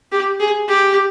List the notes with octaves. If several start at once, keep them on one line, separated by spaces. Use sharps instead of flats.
G4
G#4
G4